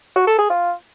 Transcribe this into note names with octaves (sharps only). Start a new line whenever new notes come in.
F#4
A4
G#4
F4